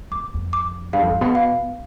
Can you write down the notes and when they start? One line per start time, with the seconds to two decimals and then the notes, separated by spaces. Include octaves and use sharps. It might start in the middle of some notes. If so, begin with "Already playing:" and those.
0.11 F2 D6
0.34 F2
0.53 D6
0.93 G2 F5
1.02 F2
1.10 G2
1.21 B2
1.35 F5